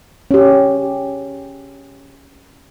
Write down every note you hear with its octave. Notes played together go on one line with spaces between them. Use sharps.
C#4 G4